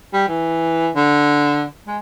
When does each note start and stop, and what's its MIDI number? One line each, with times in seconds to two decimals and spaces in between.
0.13 0.26 55
0.28 0.88 52
0.96 1.64 50
1.87 1.98 56